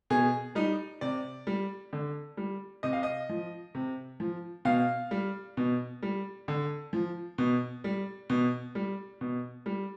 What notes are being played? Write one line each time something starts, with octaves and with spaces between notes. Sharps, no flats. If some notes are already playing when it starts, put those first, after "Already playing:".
B2 G#4
G3 D#4
C3 D5
G3
D3
G3
C3 D#5
F5
D#5
F3
C3
F3
B2 F5
G3
B2
G3
D3
F3
B2
G3
B2
G3
B2
G3